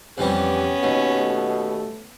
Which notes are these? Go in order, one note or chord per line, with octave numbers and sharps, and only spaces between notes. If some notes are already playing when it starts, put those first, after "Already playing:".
F2 E3 G3 B3 C#4 G4
D#2 B2
A3